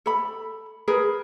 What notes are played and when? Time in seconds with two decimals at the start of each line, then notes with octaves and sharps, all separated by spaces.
0.06 A4 B5
0.88 G#4 A#4 B4 B5